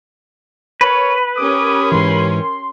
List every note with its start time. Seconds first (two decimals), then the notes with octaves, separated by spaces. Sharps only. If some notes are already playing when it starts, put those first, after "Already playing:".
0.81 A#4 B4 C#5
1.36 C#4 G4 A#4 D6 D#6
1.92 G#2 E3 C6
2.29 C6